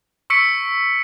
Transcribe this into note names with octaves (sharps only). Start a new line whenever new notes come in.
C#6 E6 B6 C#7 D7